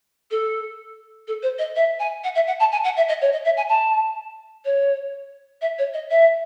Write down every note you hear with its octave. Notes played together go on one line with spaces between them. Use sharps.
A4
A4
C5
D#5
E5
G#5
F#5
E5
F#5
A5
G#5
F#5
E5
D#5
C#5
D#5
E5
G#5
A5
C#5
E5
C#5
D#5
E5